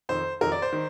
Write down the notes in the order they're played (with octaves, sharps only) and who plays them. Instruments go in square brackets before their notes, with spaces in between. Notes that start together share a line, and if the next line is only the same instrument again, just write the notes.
[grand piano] F2 D#3 C5
F2 D#3 A#4
D5
C5
D#3